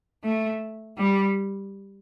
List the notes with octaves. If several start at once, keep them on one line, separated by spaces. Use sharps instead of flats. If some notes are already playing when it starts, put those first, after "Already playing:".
A3
G3